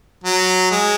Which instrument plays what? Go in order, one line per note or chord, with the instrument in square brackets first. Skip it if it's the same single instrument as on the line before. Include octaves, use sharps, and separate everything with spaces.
[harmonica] F#3
G#3